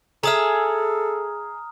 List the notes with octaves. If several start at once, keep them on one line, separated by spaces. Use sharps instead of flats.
G#4 A4 E5 A#5 D#6 F6